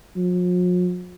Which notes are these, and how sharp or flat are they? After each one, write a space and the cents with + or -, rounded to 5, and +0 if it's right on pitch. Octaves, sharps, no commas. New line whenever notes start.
F3 +45